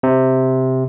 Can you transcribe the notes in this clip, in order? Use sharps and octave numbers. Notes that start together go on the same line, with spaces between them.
C3